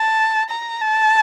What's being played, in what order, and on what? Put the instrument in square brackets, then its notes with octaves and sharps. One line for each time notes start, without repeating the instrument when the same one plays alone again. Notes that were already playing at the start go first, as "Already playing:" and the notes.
Already playing: [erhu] A5
A#5
A5